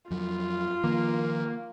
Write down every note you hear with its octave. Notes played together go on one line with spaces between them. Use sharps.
F2 F#3 F4
D#3 F3 A#3